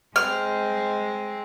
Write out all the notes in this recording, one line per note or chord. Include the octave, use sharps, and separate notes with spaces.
G#3 C4 F6